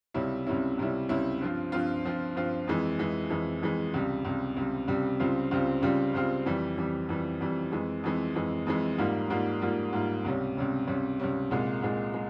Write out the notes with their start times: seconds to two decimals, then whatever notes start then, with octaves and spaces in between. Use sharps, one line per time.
0.14 C#2 C3 G3 C#4 E4
0.47 C#2 C3 G3 C#4 E4
0.78 C#2 C3 G3 C#4 E4
1.09 C#2 C3 G3 C#4 E4
1.41 G2 F3 C4 F4
1.72 G2 F3 C4 F4
2.05 G2 F3 C4 F4
2.35 G2 F3 C4 F4
2.67 F2 E3 G#3
2.99 F2 E3 G#3
3.30 F2 E3 G#3
3.62 F2 E3 G#3
3.94 C#2 C3 G3
4.25 C#2 C3 G3
4.57 C#2 C3 G3
4.88 C#2 C3 G3
5.20 C#2 C#3 G3 C4 F4
5.51 C#2 C#3 G3 C4 F4
5.82 C#2 C#3 G3 C4 F4
6.14 C#2 C#3 G3 C4 F4
6.46 F2 E3 G3
6.78 F2 E3 G3
7.09 F2 E3 G3
7.40 F2 E3 G3
7.72 F2 E3 G#3
8.04 F2 E3 G#3
8.35 F2 E3 G#3
8.66 F2 E3 G#3
8.98 G#2 G3 A#3 F4
9.30 G#2 G3 A#3 F4
9.61 G#2 G3 A#3 F4
9.93 G#2 G3 A#3 F4
10.25 C#2 C3 G3 C#4
10.57 C#2 C3 G3 C#4
10.87 C#2 C3 G3 C#4
11.20 C#2 C3 G3 C#4
11.51 C2 A#2 G#3
11.82 C2 A#2 G#3
12.14 G#3